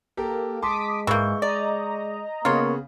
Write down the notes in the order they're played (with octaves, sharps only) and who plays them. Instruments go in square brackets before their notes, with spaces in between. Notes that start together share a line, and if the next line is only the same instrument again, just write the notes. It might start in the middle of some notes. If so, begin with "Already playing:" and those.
[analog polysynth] A#3 [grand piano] G4 A4 A#4
[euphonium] G#3 [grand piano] A5 C6 [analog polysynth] D6 D#6 B6
[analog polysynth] G#2 [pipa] E3 A#3 [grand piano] C#6 G6
[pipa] D5 [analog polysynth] D#5 A#5
[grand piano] C#3 B3 [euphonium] A#3 [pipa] F4 C#5